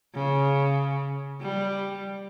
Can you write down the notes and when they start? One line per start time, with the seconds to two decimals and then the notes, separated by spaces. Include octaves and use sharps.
0.15 C#3
1.41 G3